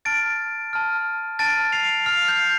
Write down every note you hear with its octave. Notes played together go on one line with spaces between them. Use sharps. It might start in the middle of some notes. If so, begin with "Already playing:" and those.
A5 F6 A6 D7
A5 F6
A5 F6 A6 D7
C7 F7
A5 F6 C7 F7
G6 C7